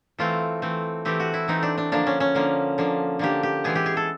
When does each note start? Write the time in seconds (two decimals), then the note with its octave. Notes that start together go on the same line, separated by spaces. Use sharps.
0.18 E3 A3 C4 F4
0.62 E3 A3 C4
1.05 E3 A3 C4 G4
1.20 F#4
1.34 E4
1.48 E3 A3 C4 D#4
1.63 D4
1.78 D4
1.92 D3 F3 A#3 D4
2.07 C#4
2.20 C#4
2.35 D3 F3 A#3
2.78 D3 F3 A#3
3.19 D3 F3 A#3 G4
3.43 G4
3.64 E3 G#3 B3 G#4
3.75 G4
3.86 G#4
3.97 A4